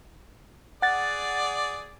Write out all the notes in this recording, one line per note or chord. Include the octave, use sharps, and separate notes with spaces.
G#4 D5 F#5 A6